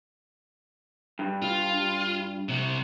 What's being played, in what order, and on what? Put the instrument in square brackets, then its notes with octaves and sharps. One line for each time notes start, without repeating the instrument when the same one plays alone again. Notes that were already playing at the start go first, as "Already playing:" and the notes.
[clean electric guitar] G2
[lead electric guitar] F4
C3 G3